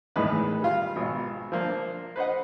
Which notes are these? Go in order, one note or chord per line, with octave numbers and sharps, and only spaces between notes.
E2 A2 D#3 G#3 B4 D#5
G3 F4
G#1 B2
F3 A#3 D4
B4 C5 D#5 F#5